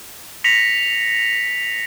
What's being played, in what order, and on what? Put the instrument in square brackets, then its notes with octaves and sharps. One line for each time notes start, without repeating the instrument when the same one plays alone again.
[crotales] A#6 B6 C#7 F7